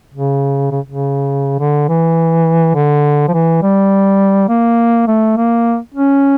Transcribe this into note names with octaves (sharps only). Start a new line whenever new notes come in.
C#3
C#3
C#3
D3
E3
D3
F3
E3
G3
A#3
A3
A#3
C#4